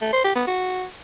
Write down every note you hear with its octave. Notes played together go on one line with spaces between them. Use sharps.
A3
C5
G4
B3
F#4